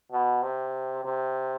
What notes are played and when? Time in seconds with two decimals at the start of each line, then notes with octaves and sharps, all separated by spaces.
0.12 B2
0.43 C3
1.04 C3